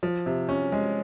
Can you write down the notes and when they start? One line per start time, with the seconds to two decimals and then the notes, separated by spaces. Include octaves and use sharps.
0.03 F3
0.26 C3
0.49 C#4
0.72 G#3